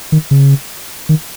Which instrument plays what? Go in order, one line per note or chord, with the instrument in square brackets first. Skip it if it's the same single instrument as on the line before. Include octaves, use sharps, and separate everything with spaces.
[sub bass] D#3
C#3
D#3